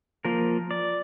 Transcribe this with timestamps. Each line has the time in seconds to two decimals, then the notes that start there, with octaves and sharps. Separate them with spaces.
0.25 F3 A#3 A#4
0.71 D5